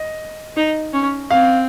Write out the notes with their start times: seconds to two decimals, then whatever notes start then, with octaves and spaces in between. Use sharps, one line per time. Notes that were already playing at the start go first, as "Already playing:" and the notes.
Already playing: D#5
0.57 D#4
0.93 C#4
1.30 C4 F5